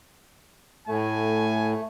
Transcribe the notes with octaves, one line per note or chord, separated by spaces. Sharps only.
A2 A3 G#5